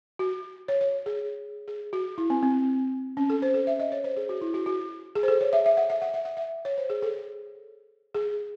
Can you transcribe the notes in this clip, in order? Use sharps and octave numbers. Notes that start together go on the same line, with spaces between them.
F#4
C#5
C#5
G#4
G#4
F#4
E4
C4
C4
C#4
A4
C5
A4
E5
D#5
C#5
C5
G#4
F#4
E4
F#4
F#4
G#4
C5
A4
C#5
E5
E5
F#5
E5
F#5
E5
F#5
E5
C#5
C5
G#4
A4
G#4